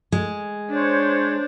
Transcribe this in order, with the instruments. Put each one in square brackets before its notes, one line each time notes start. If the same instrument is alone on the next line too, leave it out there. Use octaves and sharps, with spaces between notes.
[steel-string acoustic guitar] G#3
[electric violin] D4 [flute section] C5 C#5